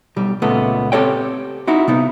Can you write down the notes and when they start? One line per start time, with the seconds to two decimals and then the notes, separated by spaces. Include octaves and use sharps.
0.16 B1 G3
0.42 C#2 A#2 A3 B3
0.92 C4 G4 A4 C#5 G5
1.67 D#4 E4 F#4
1.88 C3 B3 D#4